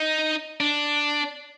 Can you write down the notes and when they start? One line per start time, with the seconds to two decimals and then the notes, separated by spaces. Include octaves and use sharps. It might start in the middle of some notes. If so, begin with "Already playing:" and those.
Already playing: D#4
0.61 D4